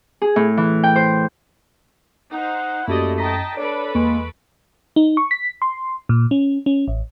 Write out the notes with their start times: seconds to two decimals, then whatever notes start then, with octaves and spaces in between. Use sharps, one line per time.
0.22 G#4
0.36 A2
0.57 E3
0.83 G5
0.96 C5
2.33 D#4 C5 F#5
2.87 F#2 A3 A#3 E4 F#4 G4 D5 D#5
3.18 D#5 G5 A5 A#5 A#6 B6
3.57 D4 A4 B4 C#5 B5 D7
3.95 E2 G#3 A#3 C#6 D7
4.96 D#4
5.17 C#6
5.31 B6
5.62 C6
6.09 A#2
6.31 C#4
6.66 C#4
6.88 A1